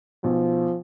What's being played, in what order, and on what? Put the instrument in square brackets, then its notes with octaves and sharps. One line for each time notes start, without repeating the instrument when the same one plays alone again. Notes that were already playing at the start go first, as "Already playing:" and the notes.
[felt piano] B1 [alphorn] F3